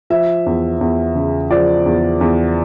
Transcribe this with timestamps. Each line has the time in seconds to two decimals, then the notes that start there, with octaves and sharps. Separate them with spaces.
0.10 F3 E5
0.46 E2
0.81 E2
1.15 C#3
1.51 F3 D5
1.86 E2
2.21 E2